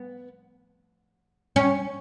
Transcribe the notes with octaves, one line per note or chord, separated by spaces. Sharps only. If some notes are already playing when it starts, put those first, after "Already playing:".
Already playing: B3
C#4